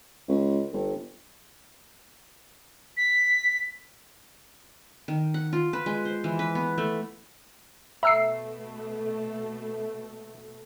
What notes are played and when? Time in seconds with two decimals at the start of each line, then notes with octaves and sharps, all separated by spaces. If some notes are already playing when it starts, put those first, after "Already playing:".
0.28 C#2
0.73 G1
2.97 B6
5.08 D#3
5.34 F#5
5.53 F4
5.73 B4
5.86 G#3
6.05 C5
6.24 E3
6.39 B4
6.55 B3
6.78 A3
8.03 B2 A3 E5 A#5 E6 C7